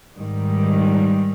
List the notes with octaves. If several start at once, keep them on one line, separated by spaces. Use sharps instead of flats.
G#2 D#3 G3